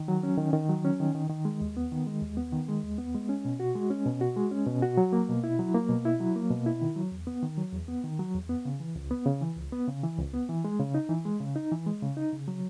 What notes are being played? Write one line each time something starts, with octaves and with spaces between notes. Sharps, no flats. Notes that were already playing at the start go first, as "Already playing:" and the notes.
Already playing: D#3
F#3
C#4
D#3
D#3
F#3
C#4
D#3
D#3
D#3
G#3
D#2
B3
D#3
G#3
D#2
B3
D#3
G#3
D#2
B3
G#3
C#4
B2
F#4
G#3
C#4
B2
F#4
G#3
C#4
B2
F#4
F#3
A#3
B2
E4
F#3
A#3
B2
E4
F#3
A#3
B2
E4
D#3
F#3
E2
B3
D#3
F#3
E2
B3
D#3
F#3
E2
B3
C#3
E3
C#2
B3
C#3
E3
C#2
B3
C#3
E3
C#2
B3
E3
G#3
C#3
D#4
E3
G#3
C#3
D#4
E3
G#3
C#3
D#4
C#3
F#3